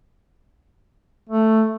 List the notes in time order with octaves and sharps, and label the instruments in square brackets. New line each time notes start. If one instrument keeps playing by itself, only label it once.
[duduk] A3